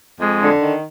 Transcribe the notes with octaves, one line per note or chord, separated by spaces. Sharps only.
F2 G#3
D3
D#3